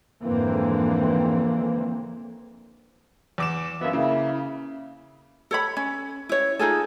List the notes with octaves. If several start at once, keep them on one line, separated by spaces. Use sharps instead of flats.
F2 G#2 D3 E3 A#3 C4
E2 D6 E7
F#2 A#3 B3 E5
C#3 A#3 E4
A4 C#5 B5
C#4
E4 C#5
D#4 F4 G#4 A4